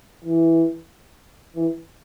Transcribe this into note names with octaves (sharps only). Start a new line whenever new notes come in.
E3
E3